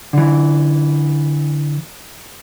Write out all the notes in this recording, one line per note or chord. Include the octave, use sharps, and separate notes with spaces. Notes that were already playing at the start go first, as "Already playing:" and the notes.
D3 E3